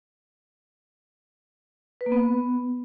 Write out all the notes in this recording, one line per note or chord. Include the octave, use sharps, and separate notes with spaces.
B4
A#3
B3